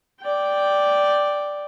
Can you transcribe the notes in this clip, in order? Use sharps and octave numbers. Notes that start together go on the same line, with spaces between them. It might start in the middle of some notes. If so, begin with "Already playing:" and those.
D5 G5